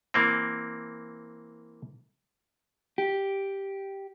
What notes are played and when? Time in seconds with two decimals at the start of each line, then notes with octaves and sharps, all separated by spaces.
0.14 E3 A#3 C4
2.98 G4